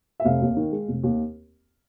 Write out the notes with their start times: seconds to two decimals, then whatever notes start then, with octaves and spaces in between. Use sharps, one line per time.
0.20 E5
0.25 F1 F5
0.41 D#2
0.57 D#3
0.72 G#3
0.88 F1
1.03 D#2